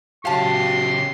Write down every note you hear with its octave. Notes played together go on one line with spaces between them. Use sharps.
C#3 F#3 G4 F5 A5 C6